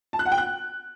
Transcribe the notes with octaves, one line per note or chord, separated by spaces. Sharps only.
A5
F#6
F#5
G5
F#6